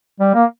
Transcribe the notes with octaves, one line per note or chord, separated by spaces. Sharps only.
G3
A#3